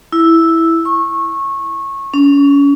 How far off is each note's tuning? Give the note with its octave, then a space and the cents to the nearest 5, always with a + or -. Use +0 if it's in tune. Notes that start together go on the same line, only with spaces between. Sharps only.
E4 -5
C#6 -20
C#4 +30